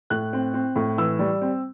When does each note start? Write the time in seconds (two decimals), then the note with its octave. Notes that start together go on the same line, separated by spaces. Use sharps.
0.10 A2 F#6
0.33 C4
0.54 C4
0.76 A2
0.98 E3 E6
1.19 G3
1.42 C4